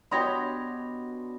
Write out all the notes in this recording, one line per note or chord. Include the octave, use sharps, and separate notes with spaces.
B2 D4 G4 C#5 B5 C6 D#6 A#6